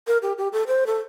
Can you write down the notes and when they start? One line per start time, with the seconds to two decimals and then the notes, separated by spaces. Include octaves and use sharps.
0.07 A#4
0.22 G4
0.38 G4
0.53 A4
0.67 C5
0.87 A4